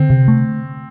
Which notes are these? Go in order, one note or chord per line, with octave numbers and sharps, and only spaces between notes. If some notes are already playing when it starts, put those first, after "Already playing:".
Already playing: D3 C4
C3
A3